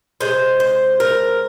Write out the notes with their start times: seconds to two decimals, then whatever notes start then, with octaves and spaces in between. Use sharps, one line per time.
0.21 C3 D#3 G#3 C5
0.60 C5
1.00 A#4